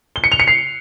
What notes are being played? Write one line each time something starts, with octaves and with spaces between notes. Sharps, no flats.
G7
C#7
F7
C#7
C7